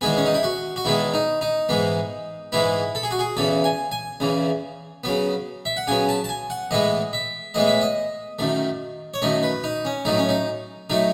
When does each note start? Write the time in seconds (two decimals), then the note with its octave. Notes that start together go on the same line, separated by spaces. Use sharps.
0.01 E2 D#3 G#3 B3 G#4
0.17 C#4
0.26 D#4
0.34 E4
0.43 F#4
0.76 F#4
0.85 E2 D#3 G#3 B3 E4
1.14 D#4
1.41 D#4
1.69 G#2 E3 G#3 B3
2.52 G#2 E3 G#3 B3 E4
2.95 A4
3.03 G#4
3.11 F#4
3.19 G#4
3.37 E2 C#3 E3 A4
3.64 G#5
3.92 G#5
4.20 E2 C#3 E3
5.04 C#3 F#3 B3
5.65 E5
5.77 F#5
5.87 C#3 F#3 B3 G#5
6.09 A5
6.24 A5
6.29 G#5
6.50 F#5
6.71 A2 E3 G#3 B3 D#5
7.13 E5
7.54 A2 E3 G#3 B3 D#5
7.68 E5
7.81 D#5
8.39 F#2 D#3 A3
9.14 C#5
9.22 F#2 D#3 A3 D#5
9.43 B4
9.64 D#4
9.85 C#4
10.05 A2 F#3 A3 D#4
10.18 C#4
10.29 D#4
10.90 A2 F#3 A3 D#4